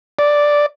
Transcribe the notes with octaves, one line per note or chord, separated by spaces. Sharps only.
D5